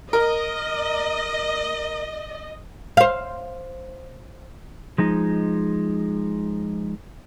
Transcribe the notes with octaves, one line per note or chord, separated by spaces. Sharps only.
A#4 D#5
C5 F5
F3 G#3 D#4